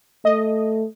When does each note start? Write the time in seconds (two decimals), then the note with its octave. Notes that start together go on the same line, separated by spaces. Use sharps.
0.25 A3 D#5